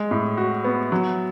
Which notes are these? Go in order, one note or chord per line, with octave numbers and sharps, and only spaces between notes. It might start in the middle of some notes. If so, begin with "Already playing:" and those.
Already playing: G#3
A2
F#4
B3
F#3